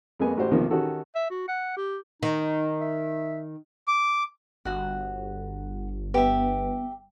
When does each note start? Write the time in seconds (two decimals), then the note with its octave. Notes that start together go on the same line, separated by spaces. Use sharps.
0.20 F2 G#3 A#3 B3 G#5
0.37 A1 F#4 G4 C5
0.51 B1 E2 C3 D#3 F3 A#3
0.70 D#3 C#4 D#4 F#4 G4 A4
1.15 E5
1.31 F#4
1.48 F#5
1.76 G4
2.23 D#3 D#4
2.81 E5
3.88 D6
4.65 G1 F#4 F#5
6.14 B3 G4 E5